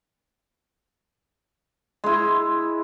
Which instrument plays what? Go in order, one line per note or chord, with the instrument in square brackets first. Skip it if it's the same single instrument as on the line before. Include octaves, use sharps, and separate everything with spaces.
[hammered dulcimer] G#3 E4